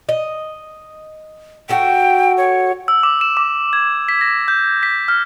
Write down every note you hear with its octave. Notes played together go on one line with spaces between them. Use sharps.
D#5
F#4 A4 G5
C#5
E6
D6
E7
D6
G#6
B6
A#6
G6
B6
F6